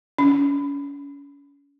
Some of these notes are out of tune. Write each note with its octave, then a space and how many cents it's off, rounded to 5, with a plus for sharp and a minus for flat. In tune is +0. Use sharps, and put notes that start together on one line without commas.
C#4 +35